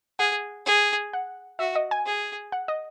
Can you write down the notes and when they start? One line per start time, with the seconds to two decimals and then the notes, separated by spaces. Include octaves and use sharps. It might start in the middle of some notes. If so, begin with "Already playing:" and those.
0.19 G#4 F#5
0.66 G#4
1.13 F#5
1.59 F#4 E5
1.76 D#5
1.91 G#5
2.06 G#4
2.52 F#5
2.68 D#5